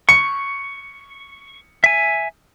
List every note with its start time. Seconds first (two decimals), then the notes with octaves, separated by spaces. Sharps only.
0.09 C#6 C#7
1.84 E5 G#5